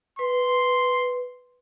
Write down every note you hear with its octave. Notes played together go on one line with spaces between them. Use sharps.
B4 C6